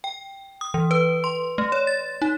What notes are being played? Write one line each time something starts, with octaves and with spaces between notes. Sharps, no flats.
G5
D#6
E3
B4
C6
A3
C#5
A6
D#4